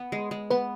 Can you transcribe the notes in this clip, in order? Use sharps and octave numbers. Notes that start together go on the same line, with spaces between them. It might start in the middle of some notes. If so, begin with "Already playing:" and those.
Already playing: B3
G#3
G#3
B3 B4